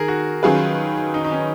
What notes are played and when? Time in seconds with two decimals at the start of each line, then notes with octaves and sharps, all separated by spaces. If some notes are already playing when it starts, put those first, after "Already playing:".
Already playing: D#3 G#4 A#4
0.08 F#4
0.43 D#3 F#3 C#4 F4 G#4 B4
1.14 D#4
1.24 D#4
1.32 C#4